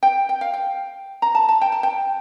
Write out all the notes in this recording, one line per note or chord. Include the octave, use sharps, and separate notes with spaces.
G5
G5
F5
G5
A#5
A5
A5
G5
A5
G5